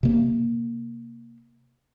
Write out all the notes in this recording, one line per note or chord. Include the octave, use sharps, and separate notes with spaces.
C3 A#3